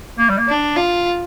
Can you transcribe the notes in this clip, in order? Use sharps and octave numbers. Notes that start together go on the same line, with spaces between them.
A#3
G3
A#3
D4
F4